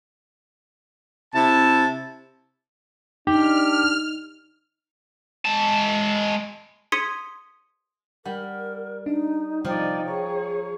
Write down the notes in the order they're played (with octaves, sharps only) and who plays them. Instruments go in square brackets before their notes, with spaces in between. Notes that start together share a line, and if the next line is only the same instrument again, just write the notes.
[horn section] C3 E4 A5
[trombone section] D4 [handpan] D#4 [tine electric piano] G4 [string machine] F6
[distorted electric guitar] G#3 A5
[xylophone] C6 D#6 G#6 B6 C#7 D#7
[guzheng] G3 [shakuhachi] A#4 [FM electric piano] F#5
[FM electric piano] D4 D#5 [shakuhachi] D#4
[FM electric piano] C3 G3 F4 [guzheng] F3 [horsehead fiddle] D#4 D5 [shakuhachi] G5
[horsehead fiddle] G#4 C#5 [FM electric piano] A#5